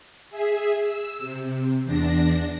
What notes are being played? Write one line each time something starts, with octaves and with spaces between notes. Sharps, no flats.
G#4 E5
E6
C3
E2 D4 A#6